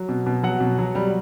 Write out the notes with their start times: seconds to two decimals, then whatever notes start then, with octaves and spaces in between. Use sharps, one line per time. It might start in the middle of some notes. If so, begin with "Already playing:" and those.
Already playing: F#3
0.09 B2
0.26 B2
0.43 F#3 F#5
0.60 B2
0.79 F#3
0.95 G3